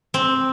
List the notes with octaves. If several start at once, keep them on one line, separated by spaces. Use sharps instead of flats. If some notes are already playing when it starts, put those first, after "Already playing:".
C4